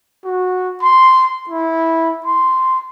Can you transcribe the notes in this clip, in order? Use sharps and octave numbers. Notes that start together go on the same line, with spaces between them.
F#4
C6
E4
C6